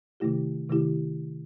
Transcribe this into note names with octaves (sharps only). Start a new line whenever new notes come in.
C3 D#3 A3 E4 G4
C3 D#3 A3 E4 G4